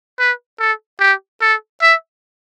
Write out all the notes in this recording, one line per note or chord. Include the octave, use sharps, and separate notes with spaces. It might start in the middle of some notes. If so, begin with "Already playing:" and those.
B4
A4
G4
A4
E5